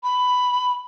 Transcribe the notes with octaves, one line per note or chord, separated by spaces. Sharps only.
B5